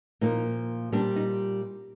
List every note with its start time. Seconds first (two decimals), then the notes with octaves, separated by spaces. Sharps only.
0.21 A#2 F3 A#3 D#4
0.92 A#2 G3 C4 D4
1.16 D#4